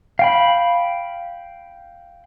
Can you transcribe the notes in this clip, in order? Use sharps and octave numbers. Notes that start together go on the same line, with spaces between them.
F5 G5 B5